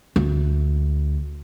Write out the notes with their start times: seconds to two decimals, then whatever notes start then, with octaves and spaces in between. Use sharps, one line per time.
0.16 D2